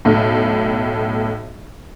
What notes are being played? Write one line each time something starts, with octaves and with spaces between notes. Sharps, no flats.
B1 A2